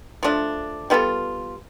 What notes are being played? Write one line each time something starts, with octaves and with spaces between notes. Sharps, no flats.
F3 A3 D4
G3 B3 F4 A4